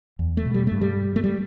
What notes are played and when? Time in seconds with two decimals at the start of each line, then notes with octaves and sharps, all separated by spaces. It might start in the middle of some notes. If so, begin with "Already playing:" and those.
0.19 E2
0.37 A3
0.45 B2
0.54 G3
0.67 G2 A3
0.81 G3
1.16 A3
1.24 G3